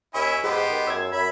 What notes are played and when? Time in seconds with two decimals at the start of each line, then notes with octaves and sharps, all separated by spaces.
0.14 D#2 C#4 E4 E5 B5
0.44 G#2 B3 G4 G#4 C5
0.70 D#3
0.87 F#2 E6 G#6
1.13 F#2 E5 B5